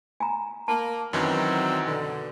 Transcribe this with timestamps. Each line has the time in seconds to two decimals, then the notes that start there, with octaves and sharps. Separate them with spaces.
0.20 G#5 A#5
0.68 A#3 A5
1.13 F#2 D#3 E3 F#3 C4
1.87 B2 D3